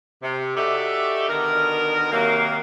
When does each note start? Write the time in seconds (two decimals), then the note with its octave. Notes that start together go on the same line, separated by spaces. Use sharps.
0.22 C3
0.55 D#4 F#4 G4 A4 D5 E5
1.28 B2 D3 D#3 A#4
2.11 C3 D#3 F#3 A#3